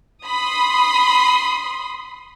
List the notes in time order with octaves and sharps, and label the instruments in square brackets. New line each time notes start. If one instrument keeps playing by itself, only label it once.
[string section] B5 C6 D#6